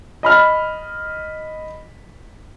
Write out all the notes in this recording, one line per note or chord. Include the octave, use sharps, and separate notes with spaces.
D#5 B5 F6